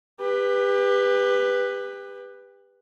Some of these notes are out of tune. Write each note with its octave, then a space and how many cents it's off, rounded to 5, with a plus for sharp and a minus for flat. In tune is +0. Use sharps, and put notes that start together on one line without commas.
G4 +30 B4 +0